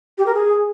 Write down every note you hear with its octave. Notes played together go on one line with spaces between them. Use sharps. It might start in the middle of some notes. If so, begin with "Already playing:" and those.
G4
A#4
G#4